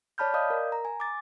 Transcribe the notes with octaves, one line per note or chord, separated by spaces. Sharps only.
C#5 D5 A5 B5 F6 G6
D5 D#5 F5 D#6 G6
A#4
A#5
G#5
D6 A6